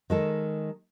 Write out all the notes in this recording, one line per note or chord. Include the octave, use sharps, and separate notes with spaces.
D#3 G#3 A4